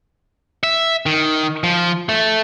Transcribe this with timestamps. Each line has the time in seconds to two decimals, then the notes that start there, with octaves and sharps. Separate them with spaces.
0.63 E5
1.06 D#3
1.63 F3
2.09 A3